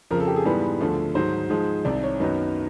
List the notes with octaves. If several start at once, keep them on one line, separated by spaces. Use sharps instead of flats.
F2 C#3 F3 A#4
A4
G4
G#4
G#2 E3 G3 B3
D2 D3 F3 A3
G#2 D#3 F#3 C5
G#2 F3 G#3
C2 C3 D#3 D5
C#5
F#2 D#3 F#3 B3 D#4